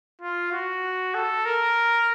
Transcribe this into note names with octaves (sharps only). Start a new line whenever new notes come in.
F4
F#4
A4
A#4